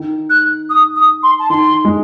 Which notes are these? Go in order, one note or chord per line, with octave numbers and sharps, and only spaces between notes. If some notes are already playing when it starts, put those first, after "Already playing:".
Already playing: D#3
F#6
D#6
D#6
C6
A5
D#3 C6
G#3